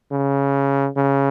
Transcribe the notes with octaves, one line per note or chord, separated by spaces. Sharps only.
C#3
C#3